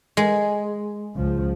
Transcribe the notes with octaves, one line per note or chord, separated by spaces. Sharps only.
G#3
C#2 F3